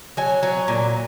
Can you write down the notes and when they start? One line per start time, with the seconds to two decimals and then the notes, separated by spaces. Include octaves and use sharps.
0.17 F#3 G#5
0.43 F#3
0.68 A#2